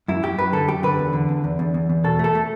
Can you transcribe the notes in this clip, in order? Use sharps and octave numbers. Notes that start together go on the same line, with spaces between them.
F#2 E4
F#2 G4
F#2 B4
D3 A4
F#2 G4
D3 B4
E2
D3
E2
E2
E2
E2
E2
B2 A4
A3 A4
A3